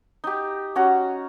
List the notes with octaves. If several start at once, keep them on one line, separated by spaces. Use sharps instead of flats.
D#4 G4
C#4 F#4 A#5